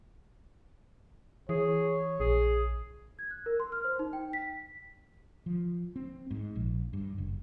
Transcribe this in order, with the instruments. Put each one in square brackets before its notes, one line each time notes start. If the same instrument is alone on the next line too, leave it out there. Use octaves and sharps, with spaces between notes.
[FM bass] E3 [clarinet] G#4 [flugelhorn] C#5
[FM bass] A#1 [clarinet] G#4
[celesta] G#6
F#6
A#4
C6
F6
C5
D#4
G5
B6
[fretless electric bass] F3
C4
G#2
A#1
G2
F#1